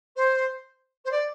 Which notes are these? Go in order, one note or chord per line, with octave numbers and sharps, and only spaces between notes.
C5
C5
D5